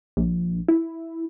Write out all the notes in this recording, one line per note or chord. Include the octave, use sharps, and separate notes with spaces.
A#1
E4